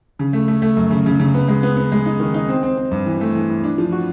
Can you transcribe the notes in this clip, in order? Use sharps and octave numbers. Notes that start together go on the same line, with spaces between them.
C#3
A3
A3
A3
F#2
C#3
C#3
C#3
B3
G#3
B3
B3
G#3
D#4
D#3
D#4
C4
C4
C4
G2
E3
A3
E3
E3
D4
F3
F#4